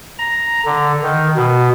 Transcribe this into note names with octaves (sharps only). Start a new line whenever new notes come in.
A#5
D3
D#3
B2